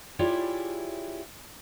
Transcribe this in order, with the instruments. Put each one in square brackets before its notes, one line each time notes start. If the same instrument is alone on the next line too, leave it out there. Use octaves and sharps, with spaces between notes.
[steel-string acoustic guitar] E4 F4 G4 G#4 C#5 D5